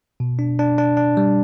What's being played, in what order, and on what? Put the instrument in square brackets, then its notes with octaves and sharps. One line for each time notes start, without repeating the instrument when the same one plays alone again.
[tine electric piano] B2
D4
D4
D4
D4
G3